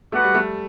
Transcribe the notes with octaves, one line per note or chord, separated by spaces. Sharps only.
A3 F#4 B4 D5 F#5
G3
A3